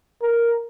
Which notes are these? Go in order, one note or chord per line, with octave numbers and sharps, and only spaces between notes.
A#4